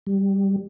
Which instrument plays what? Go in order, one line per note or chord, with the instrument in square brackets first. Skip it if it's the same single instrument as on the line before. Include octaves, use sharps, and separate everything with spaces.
[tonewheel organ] G3